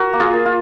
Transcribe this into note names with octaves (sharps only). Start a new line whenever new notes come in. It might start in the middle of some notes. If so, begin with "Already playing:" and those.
Already playing: F#4 A#4
A#3
F4 G#4
A#3
F4